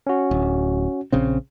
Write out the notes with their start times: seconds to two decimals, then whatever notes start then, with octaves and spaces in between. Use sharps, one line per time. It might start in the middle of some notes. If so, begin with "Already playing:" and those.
0.07 C#4 F#4
0.31 D1
1.12 A#1 C#3 C4